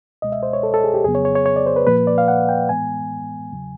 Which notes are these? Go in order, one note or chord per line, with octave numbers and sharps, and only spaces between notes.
C#2 B2 G#3 D#5
E5
C5
C#5
A4
A4
G#4
G4
F2 C#3 F#3 B3 G#4
C#5
C#5
C#5
C#5
D5
C5
B4
A#2 F3 A#3 B4
D5
F5
F#5
G5
A2 E3 G#3 B3 G#5
E2 C#3 F#3